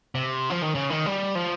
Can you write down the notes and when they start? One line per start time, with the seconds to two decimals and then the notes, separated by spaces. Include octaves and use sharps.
0.15 C3
0.50 F3
0.63 D#3
0.75 C#3
0.90 D#3
1.06 G3
1.35 F3